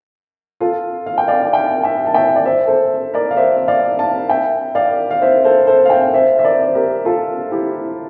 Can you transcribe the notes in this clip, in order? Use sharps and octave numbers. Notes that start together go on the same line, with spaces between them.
F4 A4
F5
G5
D5 F5
F5
E5 G5
E5 G5
A5
E5 G5
D5
C5 E5
A4 C5
A#4 D5
F5
C5 E5
E5
D5 F5
F5 A5
E5 G5
D5 F5
F5
C5 E5
A4 C5
A4 C5
F5
E5 G5
C5 E5
E5
A#4 D5
C5
G4 A#4
F4 A4
E4 G4